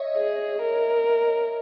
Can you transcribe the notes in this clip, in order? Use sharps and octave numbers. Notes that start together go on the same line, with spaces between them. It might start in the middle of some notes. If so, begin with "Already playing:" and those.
Already playing: C#5 D#5 E5
G#4
A#4